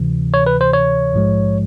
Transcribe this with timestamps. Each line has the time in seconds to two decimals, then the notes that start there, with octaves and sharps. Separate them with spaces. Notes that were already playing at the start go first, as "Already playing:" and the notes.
Already playing: D2 C3 E3
0.34 C#5
0.46 B4
0.61 C5
0.73 C#5
1.13 A#1 G#2 F3 G#3